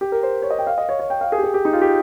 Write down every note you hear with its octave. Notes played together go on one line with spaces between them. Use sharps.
G4
A#4
C5
C#5
D#5
G5
F5
D#5
C#5
C#5
G5
F5
G#4
G4
G#4
G4
D#4
F4
G4